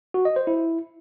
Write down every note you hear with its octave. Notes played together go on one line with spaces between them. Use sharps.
F#4
D#5
C5
E4